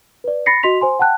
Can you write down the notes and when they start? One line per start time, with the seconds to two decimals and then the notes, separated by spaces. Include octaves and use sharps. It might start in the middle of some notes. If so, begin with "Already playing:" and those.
0.24 B4 D5
0.46 B5 A6 A#6 C7 C#7
0.63 F#4 D#5 C6 B6 F7
0.81 C5 G#5 C6
0.99 F#5 G5 A5 F#6